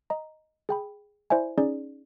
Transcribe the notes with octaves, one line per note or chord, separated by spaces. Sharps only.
D#5 A#5
G#4 G5 B5
E4 C5 D5 E5 G#5
C#4 D#4 G#4 D5